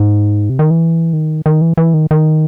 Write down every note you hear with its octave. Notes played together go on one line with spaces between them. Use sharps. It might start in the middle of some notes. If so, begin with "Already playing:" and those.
Already playing: G#2
C3
D#3
E3
D#3
D#3
E3
E3
D#3
D#3